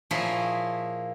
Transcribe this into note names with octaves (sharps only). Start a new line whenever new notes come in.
A#2 F3 E4 G#4 C#5